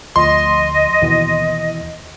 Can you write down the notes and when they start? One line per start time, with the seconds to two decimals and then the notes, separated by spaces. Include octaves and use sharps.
0.16 D2 F3 D#5 C6
1.02 D#2 B2 E3